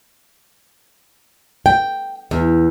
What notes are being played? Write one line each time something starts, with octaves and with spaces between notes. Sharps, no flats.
G5
E2